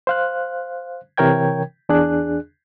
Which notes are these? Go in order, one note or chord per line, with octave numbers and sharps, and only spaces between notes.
C5 F5 F#6
C3 E3 A#4 C#5 G5 G#6
E2 D4 G#4 F#6